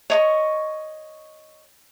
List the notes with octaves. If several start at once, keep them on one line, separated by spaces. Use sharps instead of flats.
C#5 D#5 C#6